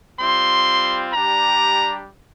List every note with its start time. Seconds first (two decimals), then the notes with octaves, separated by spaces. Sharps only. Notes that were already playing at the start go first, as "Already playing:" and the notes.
0.19 G3 C4 F4 C6
1.13 G3 D4 G4 A#5